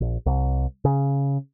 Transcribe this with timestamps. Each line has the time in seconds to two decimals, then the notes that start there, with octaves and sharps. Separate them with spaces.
0.01 A#1
0.26 C2
0.85 C#3